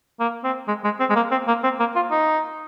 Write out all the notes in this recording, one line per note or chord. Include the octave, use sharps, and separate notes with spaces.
A#3
C4
G#3
G#3
C4
G#3
A#3
C4
A#3
C4
A#3
F4
D#4